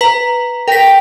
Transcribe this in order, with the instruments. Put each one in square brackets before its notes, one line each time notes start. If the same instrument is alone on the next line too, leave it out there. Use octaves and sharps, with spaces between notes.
[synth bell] B4 A#5
[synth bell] A#4 B6 [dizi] G5